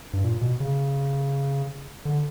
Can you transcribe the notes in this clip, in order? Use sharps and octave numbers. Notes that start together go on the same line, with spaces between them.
G2
A#2
B2
C#3
D3